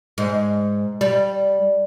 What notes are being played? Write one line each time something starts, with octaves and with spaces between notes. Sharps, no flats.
G#2
G3